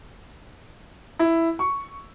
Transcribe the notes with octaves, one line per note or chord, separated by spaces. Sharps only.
E4
C#6